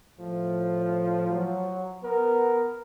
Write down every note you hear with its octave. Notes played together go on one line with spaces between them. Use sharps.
A2 F3
F#3
B3 A#4